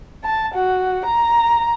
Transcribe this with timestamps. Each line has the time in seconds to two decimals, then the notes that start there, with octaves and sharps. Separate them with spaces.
0.24 A5
0.55 F#4
1.06 A#5